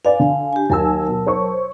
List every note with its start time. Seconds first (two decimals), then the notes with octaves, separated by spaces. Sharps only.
0.05 B4 D5 F5 G#5
0.20 D3
0.53 G4 G#5
0.70 D#2 F#3 A#4 G#5 A5 E6
1.08 B2
1.26 C5 C#5 C#6